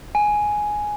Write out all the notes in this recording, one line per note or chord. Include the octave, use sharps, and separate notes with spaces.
G#5